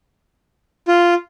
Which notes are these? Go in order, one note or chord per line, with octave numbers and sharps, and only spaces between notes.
F4